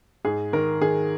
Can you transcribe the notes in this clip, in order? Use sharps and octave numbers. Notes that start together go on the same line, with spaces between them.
G#2 G#4
D#3 A#4
D#3 G#4